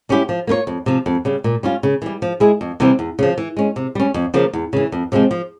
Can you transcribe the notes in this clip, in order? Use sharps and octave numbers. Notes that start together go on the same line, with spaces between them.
G3 C#4 E4 G4
F3
A#3 F4 A#4 C#5
F2
C3 F3
F2
C#3 G3
A#2
G3 C#4 F4
C#3
E3 G3
F3
G#3 E4 G#4
F2
C3 E3 G3 C4
E2
C#3 F3
E3
G#3 C#4
C3
G3 C#4
F2
C#3 F3 A#3
E2
C#3 E3
F2
C3 F3 G#3 C4
F3